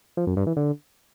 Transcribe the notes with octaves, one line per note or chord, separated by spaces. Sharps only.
F3
F#2
G2
E3
D3